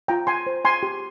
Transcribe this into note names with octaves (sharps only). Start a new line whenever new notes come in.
F4 G5 A#5
G#5 C6
C5
G#5 C6
G4